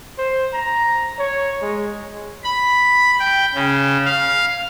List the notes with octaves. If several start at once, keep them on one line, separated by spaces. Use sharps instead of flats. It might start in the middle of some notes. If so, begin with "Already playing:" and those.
C5
A#5
C#5
G#3
B5
G5
C#3
F5